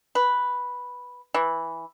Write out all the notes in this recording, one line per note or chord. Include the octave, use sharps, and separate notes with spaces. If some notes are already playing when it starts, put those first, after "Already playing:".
B4
E3